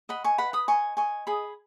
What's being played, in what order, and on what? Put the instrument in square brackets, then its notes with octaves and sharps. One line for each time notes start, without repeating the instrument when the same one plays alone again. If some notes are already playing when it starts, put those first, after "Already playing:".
[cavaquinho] D#5 F#5 B5
G#5 C#6
B4 F#5 B5
B5 D#6
D#5 G#5 C#6
D#5 G#5 C#6
G#4 B5 D#6